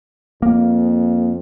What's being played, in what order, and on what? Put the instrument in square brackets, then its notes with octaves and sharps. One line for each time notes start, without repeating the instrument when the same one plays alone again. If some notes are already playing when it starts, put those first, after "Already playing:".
[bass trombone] F2 [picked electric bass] A#3